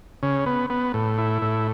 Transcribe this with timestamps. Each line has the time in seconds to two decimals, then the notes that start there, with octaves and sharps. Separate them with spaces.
0.23 C#3
0.46 B3
0.70 B3
0.94 A2
1.18 E4
1.42 A2